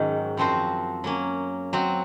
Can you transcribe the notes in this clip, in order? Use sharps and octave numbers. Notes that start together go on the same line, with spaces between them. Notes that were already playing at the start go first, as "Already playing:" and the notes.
Already playing: G#2 D#3 F#3 C#4
F#2 F3 C4 F#4 C5
F#3 A#3 C#4
F#3 C4 F#4